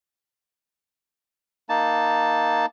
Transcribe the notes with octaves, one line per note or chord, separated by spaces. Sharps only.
A#3 D#4 A5